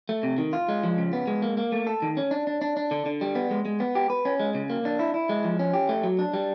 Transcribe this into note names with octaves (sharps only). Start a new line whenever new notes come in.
A3
C3
D#3
F4
G#3
F3
C#3
B3
G#3
A#3
A#3
A3
A4
D#3
C#4
D4
D4
D4
D4
D3
D3
G3
B3
G#3
G#3
B3
G4
B4
C#4
G#3
C#3
A#3
D4
E4
E4
G#3
F3
C#4
G4
A3
F#3
D4
G3